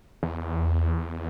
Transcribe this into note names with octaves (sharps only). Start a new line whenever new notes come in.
E2